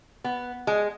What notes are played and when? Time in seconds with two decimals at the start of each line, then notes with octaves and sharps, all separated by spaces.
0.24 B3
0.67 G#3